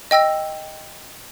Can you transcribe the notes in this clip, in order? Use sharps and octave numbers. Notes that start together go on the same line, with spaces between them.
D#5 G5 E6 A#6